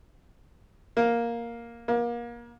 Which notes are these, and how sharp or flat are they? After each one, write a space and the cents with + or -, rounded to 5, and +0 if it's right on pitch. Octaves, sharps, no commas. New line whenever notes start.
A#3 +5
A#3 +30